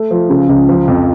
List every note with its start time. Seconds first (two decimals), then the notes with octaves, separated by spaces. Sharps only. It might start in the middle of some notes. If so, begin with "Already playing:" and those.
Already playing: A3
0.11 F3
0.30 C#3
0.49 C#2
0.69 F3
0.88 F2